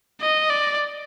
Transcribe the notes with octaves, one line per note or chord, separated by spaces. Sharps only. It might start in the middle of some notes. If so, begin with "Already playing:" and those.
D#5
D5